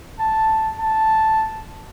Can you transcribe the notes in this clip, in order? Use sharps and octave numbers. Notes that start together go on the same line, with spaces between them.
A5
A5